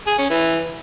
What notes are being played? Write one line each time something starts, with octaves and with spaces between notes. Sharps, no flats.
G#4
C#4
E3